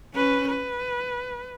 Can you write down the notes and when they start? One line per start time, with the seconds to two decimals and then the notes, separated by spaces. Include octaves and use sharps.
0.14 C#4 B4
0.48 B4